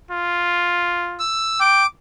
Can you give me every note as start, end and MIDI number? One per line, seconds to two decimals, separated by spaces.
0.11 1.22 65
1.20 1.60 88
1.60 1.83 79
1.60 1.86 86